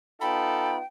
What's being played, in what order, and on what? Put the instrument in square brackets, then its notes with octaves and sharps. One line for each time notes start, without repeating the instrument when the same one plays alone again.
[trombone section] B3 D#4 F4 [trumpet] A4 [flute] G5 [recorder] B5